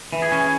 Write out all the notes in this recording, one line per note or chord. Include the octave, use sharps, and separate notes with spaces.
E3
G#4
C#4